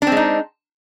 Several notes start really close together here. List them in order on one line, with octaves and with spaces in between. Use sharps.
D4 C4 G#3 D#4